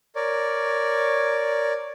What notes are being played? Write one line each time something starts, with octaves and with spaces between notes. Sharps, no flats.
A#4 C#5 D5